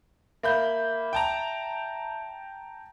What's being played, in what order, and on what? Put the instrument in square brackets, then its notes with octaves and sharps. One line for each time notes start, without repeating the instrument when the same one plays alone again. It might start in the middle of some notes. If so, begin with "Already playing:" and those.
[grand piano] A#3 B5 G6 [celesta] E5
[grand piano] G5 A5 A#5